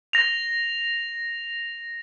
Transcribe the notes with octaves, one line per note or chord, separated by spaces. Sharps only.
A#6 F7